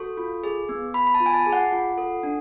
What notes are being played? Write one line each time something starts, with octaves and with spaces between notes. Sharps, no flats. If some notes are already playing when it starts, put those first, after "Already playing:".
Already playing: F#4 A4 C#6
F4
G#4
B3
B3 B5
B5
A5
F4
G#5
A5
G#4
F#5
F4
A4
D4